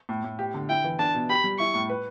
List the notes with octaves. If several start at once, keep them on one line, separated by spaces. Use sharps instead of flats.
A2
A2
G4
D3
E4 G5
E3
D4 A5
B2
G4 B5
G3
E4 C#6
A2
B4